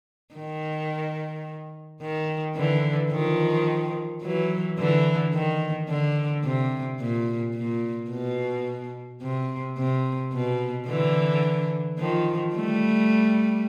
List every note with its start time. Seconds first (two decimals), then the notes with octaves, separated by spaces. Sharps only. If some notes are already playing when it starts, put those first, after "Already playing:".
0.35 D#3
2.01 D#3
2.56 D3 E3
3.11 D#3 F3
4.22 E3 F#3
4.78 D3 E3
5.34 D#3
5.89 D3
6.44 C3
7.00 A#2
7.55 A#2
8.10 B2
9.22 C3
9.78 C3
10.33 B2
10.87 D3 E3
11.98 D#3 F3
12.55 G3 A3